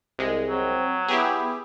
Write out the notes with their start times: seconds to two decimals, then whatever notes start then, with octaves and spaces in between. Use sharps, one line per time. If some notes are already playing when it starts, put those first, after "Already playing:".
0.19 C2 G#3
0.49 F#3 C4
1.08 B3 E4 G4 G#4